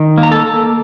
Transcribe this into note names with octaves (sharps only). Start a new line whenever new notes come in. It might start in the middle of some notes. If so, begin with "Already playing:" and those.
Already playing: D#3
A#3
A#5
A4 A5
A#3